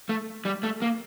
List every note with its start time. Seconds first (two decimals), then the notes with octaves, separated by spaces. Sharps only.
0.09 A3
0.45 G3
0.63 A3
0.82 A#3